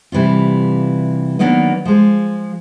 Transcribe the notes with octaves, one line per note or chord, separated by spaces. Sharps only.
C3 E3 G3 F4
D#3 F#3 A#3 B3 D4
F3 G#3